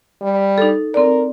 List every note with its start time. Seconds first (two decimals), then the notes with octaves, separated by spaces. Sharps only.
0.22 G3
0.58 D#4 A4
0.94 C4 A#4 D5